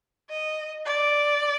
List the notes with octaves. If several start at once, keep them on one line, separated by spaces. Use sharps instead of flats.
D#5
D5